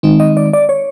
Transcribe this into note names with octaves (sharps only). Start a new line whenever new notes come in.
D#3 G#3 C4 D#4
D#5
D5
D5
C#5